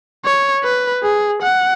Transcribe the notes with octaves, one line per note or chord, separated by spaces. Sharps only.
C#5
B4
G#4
F#5